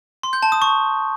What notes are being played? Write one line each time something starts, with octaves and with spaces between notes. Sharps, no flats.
C6
G6
A5
D#6
C#6